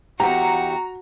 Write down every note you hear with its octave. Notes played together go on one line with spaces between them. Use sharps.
E2 F#4 G4 F#5 A#5